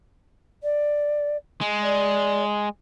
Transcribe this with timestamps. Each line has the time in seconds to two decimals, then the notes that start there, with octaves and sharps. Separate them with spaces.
0.63 D5
1.61 G#3
1.82 D5